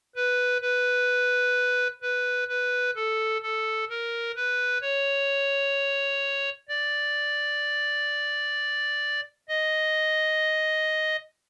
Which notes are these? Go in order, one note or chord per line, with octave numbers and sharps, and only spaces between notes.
B4
B4
B4
B4
A4
A4
A#4
B4
C#5
D5
D#5